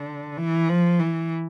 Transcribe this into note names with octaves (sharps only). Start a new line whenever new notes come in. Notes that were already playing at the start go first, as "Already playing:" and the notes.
Already playing: D3
E3
F3
E3